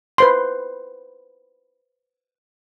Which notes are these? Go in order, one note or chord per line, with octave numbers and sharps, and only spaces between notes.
B4 C5 C6